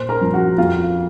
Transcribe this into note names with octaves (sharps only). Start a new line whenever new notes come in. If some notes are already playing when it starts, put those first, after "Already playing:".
Already playing: A#2 C5 C6
A#4 A#5
F3
F#4 F#5
F2 F4 F5